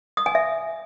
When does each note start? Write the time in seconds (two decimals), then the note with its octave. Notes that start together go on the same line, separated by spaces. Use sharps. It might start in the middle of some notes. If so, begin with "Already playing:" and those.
0.17 D#6
0.26 G#5
0.35 E5